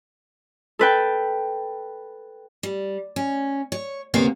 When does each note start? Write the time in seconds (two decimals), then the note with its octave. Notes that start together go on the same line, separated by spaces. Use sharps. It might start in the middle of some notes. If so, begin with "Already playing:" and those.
0.79 A4 B4 G5
2.63 G3
3.16 C#4
3.72 C#5
4.14 D2 C3 A#3 B3 C#5 F5